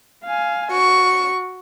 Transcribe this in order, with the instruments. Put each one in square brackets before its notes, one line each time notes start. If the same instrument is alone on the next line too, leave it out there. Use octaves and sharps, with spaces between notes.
[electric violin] F5 G#5
[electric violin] F#4 [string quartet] C#6